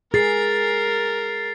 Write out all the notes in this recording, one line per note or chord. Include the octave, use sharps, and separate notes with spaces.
G#4 A#4 A6 C7